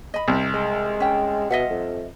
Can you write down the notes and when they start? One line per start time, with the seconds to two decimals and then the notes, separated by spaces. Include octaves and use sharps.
0.14 D#5 B5
0.28 C2
0.54 G#3 D#5
1.00 C#4 G5
1.50 B2 D#5 E5 F#5
1.70 F2